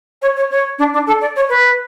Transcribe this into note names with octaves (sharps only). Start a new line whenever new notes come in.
C#5
C#5
C#5
D4
D4
A4
D5
C#5
B4